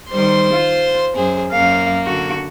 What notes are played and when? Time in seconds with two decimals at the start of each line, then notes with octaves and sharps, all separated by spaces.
0.10 D#3 G3 C5 C6
0.53 F4
1.16 F#2 G#4 C5
1.52 F#2 A#3 F5
2.06 D3 F#4